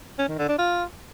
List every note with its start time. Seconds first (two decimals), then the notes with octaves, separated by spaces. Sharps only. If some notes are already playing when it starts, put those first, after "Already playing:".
0.19 C#4
0.29 D#3
0.39 D3
0.49 D4
0.58 F4